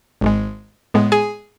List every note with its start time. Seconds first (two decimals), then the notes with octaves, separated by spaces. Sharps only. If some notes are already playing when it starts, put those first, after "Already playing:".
0.21 G#1 G#2 G#3
0.94 A2 G#3 B3
1.12 G#4 G#5